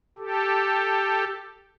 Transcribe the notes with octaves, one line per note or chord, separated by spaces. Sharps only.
G4 A4